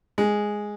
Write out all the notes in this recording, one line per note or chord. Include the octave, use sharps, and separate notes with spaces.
G#3